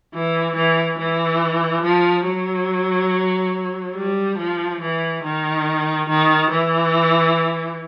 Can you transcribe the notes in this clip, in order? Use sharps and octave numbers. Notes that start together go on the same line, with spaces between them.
E3
E3
E3
F3
F#3
G3
F3
E3
D#3
D#3
E3